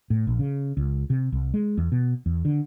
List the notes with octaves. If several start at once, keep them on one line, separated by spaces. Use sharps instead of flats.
A2
A#1
C#3
C#2
C3
C2
G#3
E2
B2
E2
D3